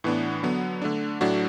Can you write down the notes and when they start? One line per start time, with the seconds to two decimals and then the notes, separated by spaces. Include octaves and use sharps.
0.04 A2 E3 B3 D4
0.43 D3 F#3 B3
0.82 D3 A3 D4
1.21 A2 F#3 A3 D4 F#4